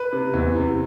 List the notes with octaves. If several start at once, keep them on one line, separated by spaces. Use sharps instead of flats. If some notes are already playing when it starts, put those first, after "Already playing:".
Already playing: B4
C3
E2
C3